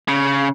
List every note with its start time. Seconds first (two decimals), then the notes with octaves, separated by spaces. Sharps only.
0.08 C#3